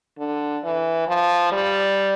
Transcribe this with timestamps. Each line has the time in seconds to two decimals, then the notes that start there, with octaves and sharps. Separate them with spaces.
0.19 D3
0.64 E3
1.08 F3
1.52 G3